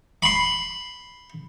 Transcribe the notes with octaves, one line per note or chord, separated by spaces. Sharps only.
B5 C6